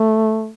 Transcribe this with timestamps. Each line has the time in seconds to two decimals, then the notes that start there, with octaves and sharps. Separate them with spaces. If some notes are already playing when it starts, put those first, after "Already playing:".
Already playing: A3